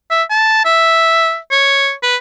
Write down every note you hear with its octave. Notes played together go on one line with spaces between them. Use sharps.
E5
A5
E5
C#5
B4